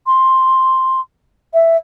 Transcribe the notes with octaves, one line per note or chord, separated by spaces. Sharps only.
C6
E5